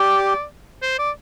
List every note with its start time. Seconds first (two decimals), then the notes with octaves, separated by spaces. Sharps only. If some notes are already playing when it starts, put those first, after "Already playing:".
Already playing: G4 D5
0.82 C5
0.99 D5